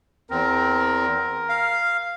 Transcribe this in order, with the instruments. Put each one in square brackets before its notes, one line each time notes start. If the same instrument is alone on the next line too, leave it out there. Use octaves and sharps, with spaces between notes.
[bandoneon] E2 C4 [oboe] A#4
[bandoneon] F5